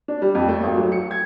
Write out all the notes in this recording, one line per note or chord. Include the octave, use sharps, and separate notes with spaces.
D4
G3
F2
A3
G#1
F#3
C#7
G#6